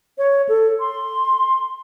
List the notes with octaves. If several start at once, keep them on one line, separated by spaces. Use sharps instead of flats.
C#5
A4
C6